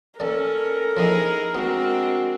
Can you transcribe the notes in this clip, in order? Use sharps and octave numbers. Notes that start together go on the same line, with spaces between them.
A#3 C#4 A4 A#4 D5
F3 A#3 B3 D#4 E4 G#4
G#3 B3 C4 D4 F#4